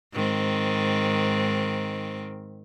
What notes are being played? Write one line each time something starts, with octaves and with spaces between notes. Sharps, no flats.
G#2 D#3 C4